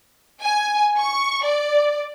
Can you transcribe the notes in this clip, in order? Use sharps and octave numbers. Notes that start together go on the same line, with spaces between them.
G#5
C#6
D5